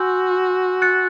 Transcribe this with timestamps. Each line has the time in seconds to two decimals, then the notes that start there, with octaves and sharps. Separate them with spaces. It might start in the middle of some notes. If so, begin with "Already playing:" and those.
Already playing: F#4 G#5 C6 E6 G6
0.82 F#6 A6 C#7